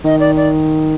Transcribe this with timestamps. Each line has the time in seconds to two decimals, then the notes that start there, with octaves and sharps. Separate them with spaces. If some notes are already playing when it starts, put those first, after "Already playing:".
0.04 D#3 D#5
0.20 D5
0.36 D5